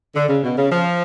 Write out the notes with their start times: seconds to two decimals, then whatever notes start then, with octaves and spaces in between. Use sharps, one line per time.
0.15 D3
0.29 C#3
0.43 B2
0.58 C#3
0.71 F3